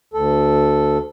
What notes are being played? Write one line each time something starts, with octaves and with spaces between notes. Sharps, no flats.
D2 A4